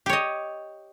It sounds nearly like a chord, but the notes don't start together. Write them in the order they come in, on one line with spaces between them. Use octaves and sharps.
G4 C#5 D#5